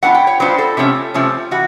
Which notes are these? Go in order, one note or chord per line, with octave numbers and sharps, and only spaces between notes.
F#3 B3 D4 F4 F#5
G5
C#5
F#3 B3 D4 F4 C5
A4
C3 F3 A3 C#4
C3 F3 A3 C#4
E3 F#4